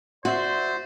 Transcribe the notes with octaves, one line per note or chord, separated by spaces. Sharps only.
F#4 C5 D5 E5 C6